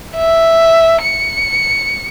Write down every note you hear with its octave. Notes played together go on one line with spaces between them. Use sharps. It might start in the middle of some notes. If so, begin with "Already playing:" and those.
E5
C#7